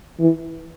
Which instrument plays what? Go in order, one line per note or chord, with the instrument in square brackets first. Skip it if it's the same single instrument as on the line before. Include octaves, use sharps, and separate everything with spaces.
[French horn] E3